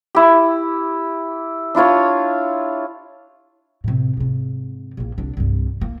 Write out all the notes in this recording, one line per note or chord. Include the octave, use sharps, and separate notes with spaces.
E4 G4
D4 E4 F4 C#5
A2 C3
G#2 C3
A#1 A#3
C2 D4
C2 G2
A#3